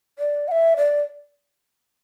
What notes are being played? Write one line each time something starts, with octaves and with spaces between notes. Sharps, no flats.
D5
F#5
E5
D5